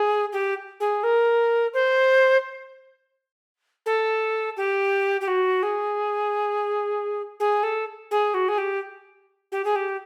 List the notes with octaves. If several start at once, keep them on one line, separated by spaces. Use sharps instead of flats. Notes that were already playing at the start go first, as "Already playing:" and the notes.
Already playing: G#4
G4
G#4
A#4
C5
A4
G4
G4
F#4
G#4
G#4
A4
G#4
F#4
G#4
G4
G4
G#4
G4